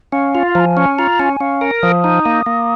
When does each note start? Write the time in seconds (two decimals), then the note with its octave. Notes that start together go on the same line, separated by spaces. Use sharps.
0.12 C#4 F5
0.35 F4
0.55 F3 A#5
0.60 G#5
0.77 C#4
0.99 F4 A#5
1.19 C#4 G#5
1.40 C#4 F5
1.61 A#4
1.83 F3 D#6
2.04 D#4
2.25 A#3
2.46 A#3